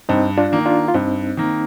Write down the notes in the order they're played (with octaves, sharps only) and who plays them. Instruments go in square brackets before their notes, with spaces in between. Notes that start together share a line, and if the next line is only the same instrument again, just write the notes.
[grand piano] G2 [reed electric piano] C4 D#4
[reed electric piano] D4 F4
[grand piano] D#3 A#3
[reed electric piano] D4 F4
F4
[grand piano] G2 [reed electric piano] C4 D#4
[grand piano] D#3 A#3